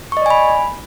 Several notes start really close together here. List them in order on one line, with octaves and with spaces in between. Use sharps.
C#6 D#5 D5 G#5 B5